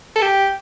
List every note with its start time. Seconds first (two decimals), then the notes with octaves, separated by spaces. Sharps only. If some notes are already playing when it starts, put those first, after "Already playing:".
0.16 A4
0.22 G4